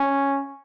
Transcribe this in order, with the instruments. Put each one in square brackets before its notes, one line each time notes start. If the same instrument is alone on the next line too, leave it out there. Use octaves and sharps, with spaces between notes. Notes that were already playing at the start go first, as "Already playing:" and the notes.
Already playing: [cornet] C#4